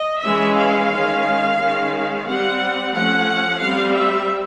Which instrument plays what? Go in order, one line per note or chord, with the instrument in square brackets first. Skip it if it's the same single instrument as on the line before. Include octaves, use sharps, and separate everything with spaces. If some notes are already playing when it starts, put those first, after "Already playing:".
Already playing: [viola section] D#5
E3 G#3 C#4 E5
F5
D#3 G#3 C#4
D#3 G#3 C#4
G3 C4 F#5
F3 A3 C#4 F#5
G3 C4 F5
E5